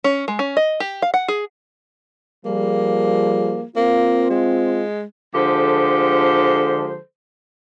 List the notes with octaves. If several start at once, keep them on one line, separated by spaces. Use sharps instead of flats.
C#4
G#3
C#4
D#5
G4
F5
F#5
G#4
F3 G3 A#3 G#4
A#3 C4 F4
G#3
D3 F3 G#3 G4 A4 C5